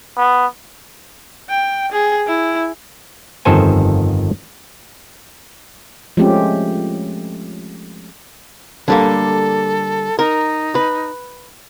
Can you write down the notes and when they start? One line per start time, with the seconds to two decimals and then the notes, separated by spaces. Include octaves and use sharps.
0.17 B3
1.49 G5
1.92 G#4
2.27 E4
3.45 G1 F2 D#3 A4 C5 G#5
6.17 F3 G#3 A3 C4 C#4 G4
8.88 D3 G3 A#3 A4
10.19 D#4 A#4
10.75 B4